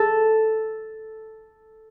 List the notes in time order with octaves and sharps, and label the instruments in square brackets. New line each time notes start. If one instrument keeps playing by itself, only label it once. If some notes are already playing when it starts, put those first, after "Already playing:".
Already playing: [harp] A4